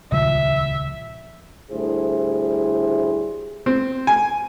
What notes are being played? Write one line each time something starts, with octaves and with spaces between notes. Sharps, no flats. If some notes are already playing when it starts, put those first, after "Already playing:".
D#1 C#2 F3 E5
D2 A2 G3 E4 G#4 C5
C4
G#5